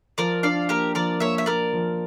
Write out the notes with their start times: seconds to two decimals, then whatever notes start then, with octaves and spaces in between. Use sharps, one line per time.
0.18 F3 A#4 D5
0.43 D4 D5 F5
0.69 A#3 G4 A#4
0.95 F3 A#4 D5
1.20 A#3 C#5 E5
1.38 E5
1.46 A#3 A#4 D5
1.73 F3